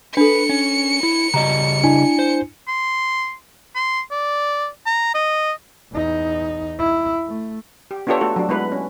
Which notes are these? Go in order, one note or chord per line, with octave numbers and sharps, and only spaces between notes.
D4 A4 B4 C#7
C#4
E4
C#3 G3 D#5 A#5
D4 E4 G#5
C5
C6
C6
D5
A#5
D#5
E2 D#4
E4
A3
G4
B3 D4 F4 G4 A4 C#5
A3 F#4 A4
F#3 D4
G#3 B3 E4 B4
C#4